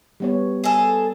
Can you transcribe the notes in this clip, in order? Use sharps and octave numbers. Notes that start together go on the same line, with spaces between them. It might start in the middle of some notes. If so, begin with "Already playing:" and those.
G3 B3 C#5
G#4 A4